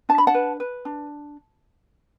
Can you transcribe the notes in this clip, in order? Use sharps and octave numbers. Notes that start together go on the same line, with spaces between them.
D4 A5
B5
F#5 A5
B4
B4
D4